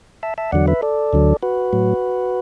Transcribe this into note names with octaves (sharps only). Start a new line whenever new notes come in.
E5 A5
E5 A5
E2 D3 F#3 D5 F#5
B4 E5
A4 D5
D2 D3 F#3
F#4 B4
A2 F#3